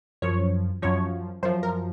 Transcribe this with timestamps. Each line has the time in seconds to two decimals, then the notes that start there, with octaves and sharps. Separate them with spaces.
0.22 F#2 F3 C#5
0.82 F#2 F3 C#5
1.43 F#2 F3 C5
1.63 A#4